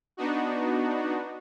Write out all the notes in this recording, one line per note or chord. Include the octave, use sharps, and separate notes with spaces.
B3 D4 D#4 F#4